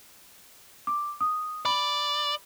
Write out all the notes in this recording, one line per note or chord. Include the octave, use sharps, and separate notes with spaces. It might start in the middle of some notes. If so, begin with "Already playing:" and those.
D6
D#6
D5 B5 F#7